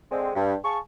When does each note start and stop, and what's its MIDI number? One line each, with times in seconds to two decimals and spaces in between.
0.11 0.30 50
0.11 0.30 56
0.11 0.30 60
0.35 0.55 43
0.63 0.78 68
0.63 0.78 77
0.63 0.78 81
0.63 0.78 85